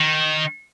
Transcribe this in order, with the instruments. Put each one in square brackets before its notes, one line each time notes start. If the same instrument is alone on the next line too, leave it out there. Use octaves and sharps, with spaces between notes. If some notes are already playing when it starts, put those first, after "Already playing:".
Already playing: [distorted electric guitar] D#3